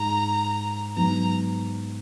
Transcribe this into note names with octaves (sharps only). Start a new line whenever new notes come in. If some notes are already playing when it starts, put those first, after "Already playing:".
Already playing: G#2 G#3 A#5
G#2 F#3 B3 A#5